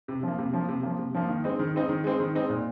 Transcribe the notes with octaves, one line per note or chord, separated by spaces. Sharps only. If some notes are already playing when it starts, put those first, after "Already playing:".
C3
F3 A#3
C3
F3 A#3
C3
F3 A#3
C3
F3 A#3
D#3
G#3 C4 D#4
D#3
G#3 C4 D#4
D#3
G#3 C4 D#4
D#3
G#3 C4 D#4
A#2